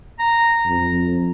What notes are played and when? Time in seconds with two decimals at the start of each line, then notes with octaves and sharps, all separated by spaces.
0.20 A#5
0.66 F2